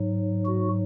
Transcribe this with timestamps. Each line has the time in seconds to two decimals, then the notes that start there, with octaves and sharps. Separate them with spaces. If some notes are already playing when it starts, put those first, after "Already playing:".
Already playing: G#2 F#3
0.46 F#4